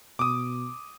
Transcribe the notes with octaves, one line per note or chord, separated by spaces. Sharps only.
B2 D6 D#6